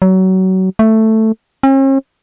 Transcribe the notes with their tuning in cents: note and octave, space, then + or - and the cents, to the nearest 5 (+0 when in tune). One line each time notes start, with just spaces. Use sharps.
F#3 +25
A3 +5
C#4 -45